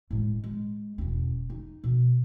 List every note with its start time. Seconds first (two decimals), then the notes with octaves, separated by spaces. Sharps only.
0.11 A2 G#3
0.44 G#3
0.98 E1 C#4
1.50 D#4
1.84 B2